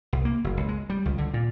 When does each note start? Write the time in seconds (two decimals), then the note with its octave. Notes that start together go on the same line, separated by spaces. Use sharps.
0.13 C2
0.25 A#3
0.44 F#1
0.57 C#2
0.69 G#3
0.90 G3
1.05 C#2
1.18 D3
1.34 A#2